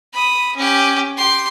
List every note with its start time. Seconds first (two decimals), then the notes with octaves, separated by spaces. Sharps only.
0.13 B5 D#6
0.56 C#4 G4
1.17 G4 C6